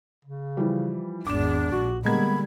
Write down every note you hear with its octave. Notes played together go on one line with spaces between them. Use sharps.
C#3
E3 F3 G3
G#1 E2 D4 D6 E7
A#1 F#4
D3 G3 G#3 A#3 B3 B5 G#6